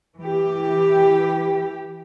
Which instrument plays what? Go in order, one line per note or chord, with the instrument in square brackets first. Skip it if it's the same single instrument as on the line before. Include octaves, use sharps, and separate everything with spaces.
[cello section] E3 G4